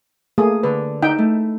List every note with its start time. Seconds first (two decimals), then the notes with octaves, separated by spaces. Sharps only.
0.38 A3 A#3 G#4 D#6
0.63 D3 B4
1.02 D#4 E4 G5
1.18 A3